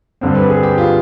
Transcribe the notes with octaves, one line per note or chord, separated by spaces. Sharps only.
G2 D3 G3 C4
B4
G#4
G4
F4